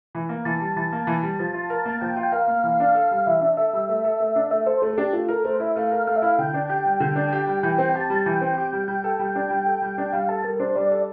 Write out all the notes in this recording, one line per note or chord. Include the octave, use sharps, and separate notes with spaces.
E3
A#3
E3 A5
G3
E3 A5
A#3
E3
G3
F3
F4
A#4
A#3
F3 G5
F4
G5
A#4 F5
A#3
E3
D4
A4
G3
E3 E5
D4
A4 E5
G3
A3
A4
A3
D4
A3 E5
A4 C5
A3 A4
A4
D4 G4
A3 F4
A4 A#4
A3 C5
E4 E5
A3 F5
A#4
A3 F5
E5
E4 F5
D3 G5
D4
G4 G5
G3
D3
D4
G4
G3
E3 G5
C4
G5
G4 A5
G3
E3 G5
C4
G4
G3
G3 G5
A4
G3
D4
G3
A4
G3
D4
G3 F5
A4 A5
G3 A#4
D4 C5
G3 D5
A4